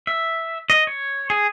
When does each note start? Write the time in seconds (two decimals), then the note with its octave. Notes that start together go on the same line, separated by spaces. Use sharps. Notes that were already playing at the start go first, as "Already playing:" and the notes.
0.07 E5
0.70 D#5
0.87 C#5
1.30 G#4